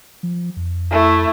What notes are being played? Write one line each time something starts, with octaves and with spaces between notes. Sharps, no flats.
F3
F2
A3 E4